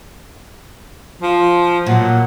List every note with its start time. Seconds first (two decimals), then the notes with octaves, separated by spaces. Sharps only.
1.22 F3
1.86 A#2 F#3